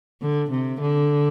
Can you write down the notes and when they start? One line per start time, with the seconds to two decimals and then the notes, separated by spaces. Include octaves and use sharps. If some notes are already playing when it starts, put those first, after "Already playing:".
0.22 D3
0.51 C3
0.81 D3